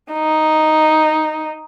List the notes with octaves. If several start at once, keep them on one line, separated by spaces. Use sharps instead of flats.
D#4